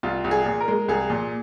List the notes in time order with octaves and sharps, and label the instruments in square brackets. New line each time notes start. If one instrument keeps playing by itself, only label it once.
[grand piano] C2 F4
C2
G#4
A#2
A#4
G#3
C2 G#4
A#2